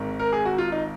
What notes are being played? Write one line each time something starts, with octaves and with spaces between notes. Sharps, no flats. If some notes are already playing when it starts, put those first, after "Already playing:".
Already playing: G#1 G#2 D#3
A#4
G#4
F#4
F4
D#4